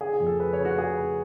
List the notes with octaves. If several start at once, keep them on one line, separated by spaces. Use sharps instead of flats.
C#3 G#4
G#4
F2
A4
C#3 B4
C#5
C#3
F#4
C#3 G#4
C#3